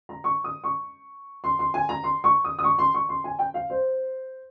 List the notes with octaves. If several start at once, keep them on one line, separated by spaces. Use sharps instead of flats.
A#5
C#6
D#6
C#6
C6
C6
G#5
A#5
C6
C#6
D#6
D#6
C#6
C6
C#6
C6
G#5
G5
F5
C5